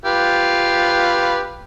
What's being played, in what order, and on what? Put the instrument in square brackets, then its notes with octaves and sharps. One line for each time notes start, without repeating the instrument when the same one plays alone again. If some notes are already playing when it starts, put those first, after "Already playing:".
[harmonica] F4 G4 B4